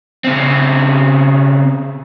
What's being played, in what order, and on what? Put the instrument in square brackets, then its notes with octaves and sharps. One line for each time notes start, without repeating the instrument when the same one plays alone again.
[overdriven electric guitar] C#3 C4